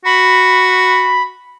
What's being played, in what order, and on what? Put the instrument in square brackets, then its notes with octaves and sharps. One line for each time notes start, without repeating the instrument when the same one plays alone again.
[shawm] F#4 [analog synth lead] B5